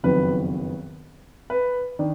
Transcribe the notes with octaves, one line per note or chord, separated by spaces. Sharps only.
F#1 F2 D#3 F#3 B3 B4
B4
D#3 D4